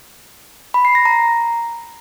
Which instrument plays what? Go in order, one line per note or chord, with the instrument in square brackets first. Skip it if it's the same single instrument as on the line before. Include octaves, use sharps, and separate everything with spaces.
[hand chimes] B5
C7
A#6
A#5